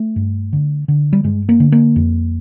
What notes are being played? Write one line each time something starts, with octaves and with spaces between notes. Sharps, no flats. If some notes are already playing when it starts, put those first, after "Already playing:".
Already playing: A3
G2
D3
D3
G3
G2 G#3
A#3
D3
A#3
F2